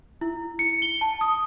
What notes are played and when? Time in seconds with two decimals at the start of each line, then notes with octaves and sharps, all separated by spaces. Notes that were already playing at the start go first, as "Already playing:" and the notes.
0.21 E4
0.59 C#7
0.82 G7
1.01 A5
1.21 D#6